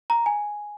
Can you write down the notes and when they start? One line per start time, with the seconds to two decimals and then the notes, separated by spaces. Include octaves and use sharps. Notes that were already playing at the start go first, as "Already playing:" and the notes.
0.10 A#5
0.26 G#5